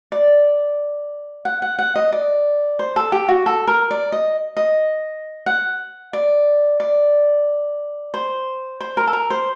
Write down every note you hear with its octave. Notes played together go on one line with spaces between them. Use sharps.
D5
F#5
F#5
F#5
D#5
D5
C5
A4
G4
F#4
A4
A#4
D5
D#5
D#5
F#5
D5
D5
C5
C5
A#4
A4
A#4
C5